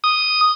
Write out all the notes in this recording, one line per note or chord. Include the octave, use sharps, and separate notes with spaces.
D#6